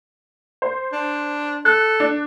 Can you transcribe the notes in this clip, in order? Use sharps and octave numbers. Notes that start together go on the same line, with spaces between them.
C5
D4
A4 F#6
D4